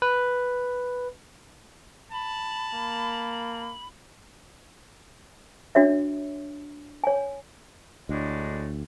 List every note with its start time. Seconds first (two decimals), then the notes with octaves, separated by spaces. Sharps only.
0.02 B4
2.12 A5 B5
2.74 A#3
5.75 D4 F#4 C#5 E5
7.04 C#5 G#5
8.09 D2 A2 G#3 D4